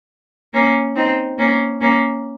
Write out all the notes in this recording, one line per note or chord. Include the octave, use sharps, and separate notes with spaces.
A#3 C#4
C4 D#4
A#3 C#4
A#3 C#4